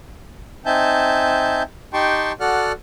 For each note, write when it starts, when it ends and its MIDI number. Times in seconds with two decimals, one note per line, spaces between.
0.66 1.63 60
0.66 1.63 63
0.66 1.63 76
0.66 1.63 80
0.66 1.63 81
0.66 1.63 91
1.93 2.32 63
1.93 2.32 67
1.93 2.32 79
1.93 2.32 81
1.93 2.32 84
1.93 2.32 85
2.40 2.72 66
2.40 2.72 69
2.40 2.72 74
2.40 2.72 78
2.40 2.72 89
2.40 2.72 90